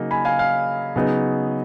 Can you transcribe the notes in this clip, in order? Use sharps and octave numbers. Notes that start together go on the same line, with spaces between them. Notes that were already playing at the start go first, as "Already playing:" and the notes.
Already playing: C#3 F#3 A#3 D#4
G#5 B5
F5 G#5
F5
C#3 F#3 B3 D#4